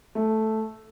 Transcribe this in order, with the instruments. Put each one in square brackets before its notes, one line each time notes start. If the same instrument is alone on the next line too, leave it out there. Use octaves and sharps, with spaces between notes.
[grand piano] A3